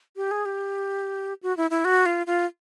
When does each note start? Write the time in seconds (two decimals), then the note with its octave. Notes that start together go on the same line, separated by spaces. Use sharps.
0.16 G4
0.31 G#4
0.46 G4
1.43 F#4
1.57 E4
1.71 E4
1.85 F#4
2.06 F4
2.27 F4